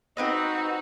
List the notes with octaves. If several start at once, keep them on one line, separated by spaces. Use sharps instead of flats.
C4 D#4 F#4 B4 D#5